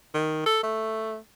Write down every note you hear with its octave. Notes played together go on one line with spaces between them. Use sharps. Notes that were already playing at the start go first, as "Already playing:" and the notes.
D#3
A4
A3